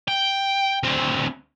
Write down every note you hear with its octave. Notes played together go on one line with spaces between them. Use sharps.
G5
D2 C4